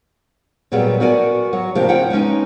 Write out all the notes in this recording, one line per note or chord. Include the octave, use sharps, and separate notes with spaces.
A#2 F#3 G3 B3 G#4
B3 F#4 A#4 D5 G#5
F#3
C3 F3 A#3 D4 G4
C#3 C4 F4 C#5 F#5 G5
G#3 B3 C#4 D#4